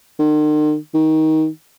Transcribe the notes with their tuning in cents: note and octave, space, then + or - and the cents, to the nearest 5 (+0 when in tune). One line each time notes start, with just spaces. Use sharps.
D#3 -45
D#3 +20